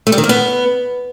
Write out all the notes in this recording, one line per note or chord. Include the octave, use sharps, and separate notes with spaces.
A3
G3
D#3
A#3
B3